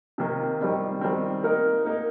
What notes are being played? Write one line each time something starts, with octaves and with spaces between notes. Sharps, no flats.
C3 D#3 A#3 D#4
D#3 G3 C4
D#3 G3 C4
A#3 D#4 A#4
A#3 D#4 A#4